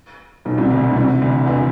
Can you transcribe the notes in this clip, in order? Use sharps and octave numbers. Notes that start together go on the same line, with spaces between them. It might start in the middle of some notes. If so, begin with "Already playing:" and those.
B1 B2
C2 C3
D2 D3
D2 D3
C2 C3
D2 D3
D3
E2 E3